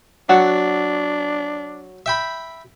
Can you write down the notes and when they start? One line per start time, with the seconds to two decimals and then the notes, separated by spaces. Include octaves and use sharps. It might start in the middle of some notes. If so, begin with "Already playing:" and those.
0.29 F#3 D4 F#5
2.06 E5 G5 B5